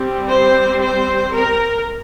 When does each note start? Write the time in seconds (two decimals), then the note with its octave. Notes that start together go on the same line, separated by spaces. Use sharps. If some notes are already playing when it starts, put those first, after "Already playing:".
Already playing: G3 C4
0.30 C5
0.82 C5
1.34 A#4